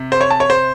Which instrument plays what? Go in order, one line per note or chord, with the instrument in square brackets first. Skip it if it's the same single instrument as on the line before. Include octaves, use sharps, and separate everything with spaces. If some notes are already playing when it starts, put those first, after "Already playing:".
Already playing: [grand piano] C3
C5
C#5
A5
C#5
C5